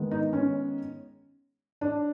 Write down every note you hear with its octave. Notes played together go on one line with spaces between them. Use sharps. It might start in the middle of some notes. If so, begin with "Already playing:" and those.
Already playing: D#3 G#3 B3
D#4
C#4
D4